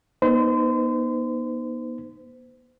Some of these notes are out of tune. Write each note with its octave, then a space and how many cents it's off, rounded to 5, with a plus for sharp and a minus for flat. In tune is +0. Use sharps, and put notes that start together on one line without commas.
B3 -40 D#4 +0 C5 -35